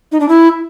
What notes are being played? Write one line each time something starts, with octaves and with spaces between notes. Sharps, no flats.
D#4
D4
E4